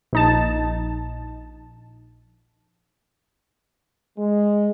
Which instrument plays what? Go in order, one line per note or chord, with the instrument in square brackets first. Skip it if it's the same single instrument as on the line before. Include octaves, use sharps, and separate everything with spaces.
[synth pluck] A#1 D#4 A5
[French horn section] G#3